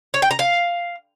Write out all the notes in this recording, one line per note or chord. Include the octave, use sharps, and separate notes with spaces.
C#5
G5
A#5
F5